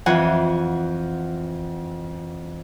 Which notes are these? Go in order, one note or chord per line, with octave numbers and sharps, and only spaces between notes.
F2 E3 F#5 G#5